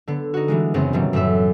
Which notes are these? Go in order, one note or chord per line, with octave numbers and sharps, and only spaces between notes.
D3 B3
D#4 F#4
E3 G3 G#3
F#2 C#3 B3 C4
B2 D#3 E3 F#3 G3
F#2 A2 E5